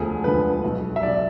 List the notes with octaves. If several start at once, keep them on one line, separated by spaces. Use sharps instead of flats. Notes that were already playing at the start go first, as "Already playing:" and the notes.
Already playing: E1 D2 D3 F3 G#4
E1 D2 D3 F3 B4
B1 B2
E5
B1 B2 D5